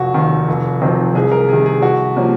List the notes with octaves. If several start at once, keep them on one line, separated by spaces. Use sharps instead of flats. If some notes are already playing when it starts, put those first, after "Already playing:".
Already playing: F1 F#4
D#2 D#3
F1
F2 D#3 F#3 C4
C2 G#4
A#4
C3 D#3 G#4
G#4
C2 F#4
C3 F3 A#3 C#4